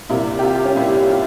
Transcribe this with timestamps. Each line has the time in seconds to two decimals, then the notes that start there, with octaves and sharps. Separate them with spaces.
0.09 C2 C3 G3 A#3 E4
0.39 G4
0.43 F4
0.65 C#4
0.76 C2 C3 G3 A#3 E4
1.10 F4